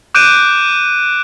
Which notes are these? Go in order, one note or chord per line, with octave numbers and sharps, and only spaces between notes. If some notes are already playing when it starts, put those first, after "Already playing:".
D6 F#6 G6 D7 D#7